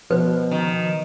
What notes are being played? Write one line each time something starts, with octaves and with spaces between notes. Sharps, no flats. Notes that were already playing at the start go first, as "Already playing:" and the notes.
B2 F3 B4 C5
D#3